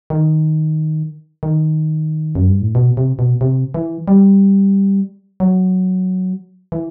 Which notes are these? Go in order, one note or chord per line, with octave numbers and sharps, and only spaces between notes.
D#3
D#3
F#2
G2
A2
B2
C3
B2
C3
E3
G3
F#3
E3